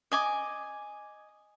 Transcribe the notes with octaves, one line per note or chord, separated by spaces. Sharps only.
D#5 G#5 D6